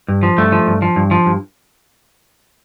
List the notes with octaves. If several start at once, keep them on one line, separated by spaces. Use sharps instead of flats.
G2
F3
G2 A3
F3
G2
F3
G2
F3
G2